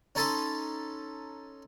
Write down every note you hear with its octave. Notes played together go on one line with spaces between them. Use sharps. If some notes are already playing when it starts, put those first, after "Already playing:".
C#4 D#4 A4 A5 B5 C6